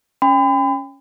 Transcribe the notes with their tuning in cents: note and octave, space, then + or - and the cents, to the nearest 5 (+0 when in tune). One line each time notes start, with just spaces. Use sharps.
C#4 +0 G5 +35 B5 +40